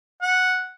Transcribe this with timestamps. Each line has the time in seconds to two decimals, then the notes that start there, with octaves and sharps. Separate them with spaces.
0.22 F#5